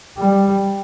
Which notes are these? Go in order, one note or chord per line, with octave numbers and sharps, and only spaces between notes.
G3